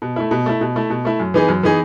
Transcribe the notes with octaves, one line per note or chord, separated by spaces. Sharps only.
B2
A3 E4
B2
A3 E4
B2
A3 E4
B2
A3 E4
F#2
E3 B3 D#4 G#4
F#2
E3 B3 D#4 G#4